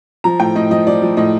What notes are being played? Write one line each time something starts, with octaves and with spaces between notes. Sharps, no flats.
F3 A#5
A2 G5
A2 D#5
F3 D#5
F3 D5
F3
A2 D#5